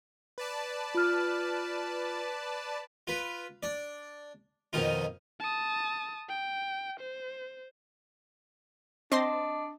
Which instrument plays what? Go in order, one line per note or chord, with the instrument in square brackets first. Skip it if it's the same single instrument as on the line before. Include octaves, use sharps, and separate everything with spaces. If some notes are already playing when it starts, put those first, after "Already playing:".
[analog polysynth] B4 D5 A5
[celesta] F4 F6
[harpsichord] F4 B4
D4 D5
F2 B2 D#3 D#4 F4
[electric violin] A5 D#6
G5
C5
[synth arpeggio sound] C4 C6 A#6 [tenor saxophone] D4 [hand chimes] D#5